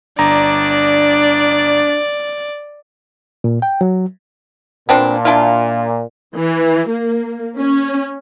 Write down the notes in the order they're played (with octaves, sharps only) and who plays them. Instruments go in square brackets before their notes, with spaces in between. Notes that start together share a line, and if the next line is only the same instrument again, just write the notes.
[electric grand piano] G1 A#5 [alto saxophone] D4 [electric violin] D5
[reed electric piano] A#2
G5
F#3
[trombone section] A#2 [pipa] B3 C4 D4
[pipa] D4 E4 F4
[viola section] E3
A#3
C#4